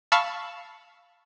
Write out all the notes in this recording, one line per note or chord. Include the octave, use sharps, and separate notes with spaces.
F5 A5 B5 C#6 E6